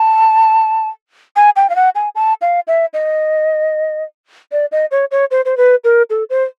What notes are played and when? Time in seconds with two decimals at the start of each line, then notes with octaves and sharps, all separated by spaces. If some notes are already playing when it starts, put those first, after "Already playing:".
Already playing: A5
1.36 G#5
1.56 G5
1.69 F5
1.76 F#5
1.95 G#5
2.15 A5
2.41 F5
2.67 E5
2.93 D#5
4.52 D5
4.72 D#5
4.91 C#5
5.11 C#5
5.31 C5
5.45 C5
5.57 B4
5.84 A#4
6.10 A4
6.30 C5